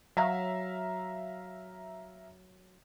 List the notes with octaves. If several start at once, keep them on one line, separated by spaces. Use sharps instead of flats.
F#3 E5 F5 A#5